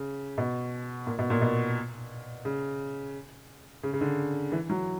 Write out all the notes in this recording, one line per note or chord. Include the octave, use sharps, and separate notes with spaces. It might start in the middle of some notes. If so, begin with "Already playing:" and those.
Already playing: C#3
B2
A#2
B2
A#2
B2
C#3
C#3
C#3
D3
E3
F#3